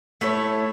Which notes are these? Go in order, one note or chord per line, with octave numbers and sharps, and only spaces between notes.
A3 E4 A4 C#5